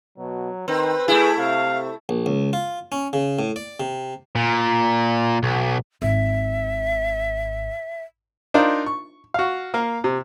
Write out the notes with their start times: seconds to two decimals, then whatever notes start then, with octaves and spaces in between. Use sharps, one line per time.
0.18 B2 F#3
0.68 D#3 C4 B4
1.08 A3 E4 G#4
1.39 C3 F5
2.09 A#1
2.26 C#2
2.53 F4
2.92 C#4
3.13 C#3
3.39 A2
3.56 D5
3.80 C3
4.36 A#2
5.43 B1
6.02 G#1 E5
8.54 D4 D#4 F4 A#4 C5
8.86 C#6
9.34 F#4 F5
9.74 A#3 F5
10.04 C3